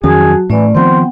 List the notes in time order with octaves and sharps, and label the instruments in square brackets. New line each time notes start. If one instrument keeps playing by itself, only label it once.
[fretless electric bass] F2 D#3 C#4 [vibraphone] F#3 F#4 A5 [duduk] G#4
[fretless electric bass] A2 [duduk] E3 [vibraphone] A3 C#4 D5
[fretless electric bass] D#3 F3 C4 [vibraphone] B3 F#5 G5 [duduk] C5